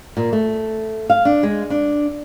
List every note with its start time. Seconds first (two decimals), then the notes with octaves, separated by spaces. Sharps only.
0.17 A#2
0.33 A3
1.10 F5
1.25 D4
1.43 G#3
1.70 D4